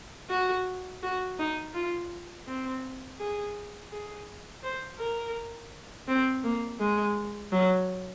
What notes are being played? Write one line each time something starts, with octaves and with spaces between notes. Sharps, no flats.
F#4
F#4
D#4
F4
C4
G#4
G#4
C5
A#4
C4
A#3
G#3
F#3